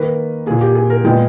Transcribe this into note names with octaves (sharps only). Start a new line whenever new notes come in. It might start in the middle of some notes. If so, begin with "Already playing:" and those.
Already playing: D#3 A#3 B4
A#2 A#3 G#4
G4
G#4
A#4
A#2 G#3 B3 G5